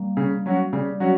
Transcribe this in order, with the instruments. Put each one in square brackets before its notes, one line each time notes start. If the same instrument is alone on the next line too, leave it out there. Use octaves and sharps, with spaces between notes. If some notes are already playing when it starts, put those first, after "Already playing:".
Already playing: [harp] G3 A#3
[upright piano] C#3
F#3 C#4 F#4
[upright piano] C#3 [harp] G3
[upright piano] F#3 C#4 F#4